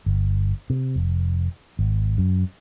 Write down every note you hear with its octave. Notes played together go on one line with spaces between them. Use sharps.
G1
C3
F1
G#1
F#2